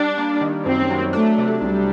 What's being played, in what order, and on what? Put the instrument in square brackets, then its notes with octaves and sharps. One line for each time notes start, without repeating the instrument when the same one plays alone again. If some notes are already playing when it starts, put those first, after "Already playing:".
Already playing: [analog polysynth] G3 [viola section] D4
[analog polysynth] A#3
D#3
[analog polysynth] F#2 [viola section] C4
[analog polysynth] F#3
[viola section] A3 [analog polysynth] D4
[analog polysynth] C3
[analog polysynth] C2 [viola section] G3